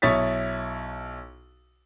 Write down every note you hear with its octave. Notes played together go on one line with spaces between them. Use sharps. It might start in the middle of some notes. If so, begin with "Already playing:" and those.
B1 E4 C#5 D#6 A6 B6